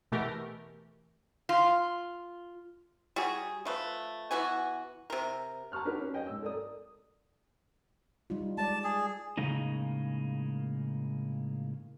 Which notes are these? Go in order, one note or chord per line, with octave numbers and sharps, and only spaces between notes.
B2 E3 A3 G4 A#4
F4
G3 F#4 G#4
F3 A3 B4
E3 B3 F#4 G#5
C3 A#4
A5 A#5 C#6 F6 F#6
D4 D#4 F#4 G4 A#4 B4
C#4
C#5 D#5 G5 G#5
G#2 E6
A4 A#4 D5 D#6
G3 D#4 F4
G#3 D5 A5
G#4
A2 C#3 G#3 A#3 D#4